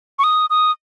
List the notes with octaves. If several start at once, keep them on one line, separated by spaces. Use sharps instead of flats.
C#6
D#6
D#6